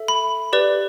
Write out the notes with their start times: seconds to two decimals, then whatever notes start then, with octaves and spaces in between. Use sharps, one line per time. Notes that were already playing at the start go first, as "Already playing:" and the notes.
Already playing: A4 E5
0.08 B5
0.53 G4 B4 D5